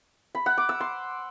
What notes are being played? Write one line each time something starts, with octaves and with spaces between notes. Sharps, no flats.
B5
F#5
D6
E6
C6